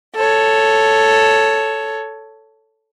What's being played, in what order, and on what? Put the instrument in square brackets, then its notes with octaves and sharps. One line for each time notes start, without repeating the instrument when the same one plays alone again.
[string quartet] A4 C#5